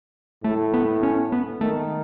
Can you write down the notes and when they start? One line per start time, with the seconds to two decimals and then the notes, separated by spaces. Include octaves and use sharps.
0.44 A2 A3
0.74 B3
1.03 C#4
1.32 B3
1.61 D#3 A3